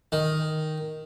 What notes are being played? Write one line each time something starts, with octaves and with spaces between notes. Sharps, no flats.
D#3